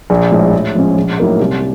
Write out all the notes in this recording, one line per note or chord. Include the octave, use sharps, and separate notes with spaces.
A#1
A2 F3 G#3
A2
F3 G#3 C#4
A#1
A2 F#3 A#3 D#4
C2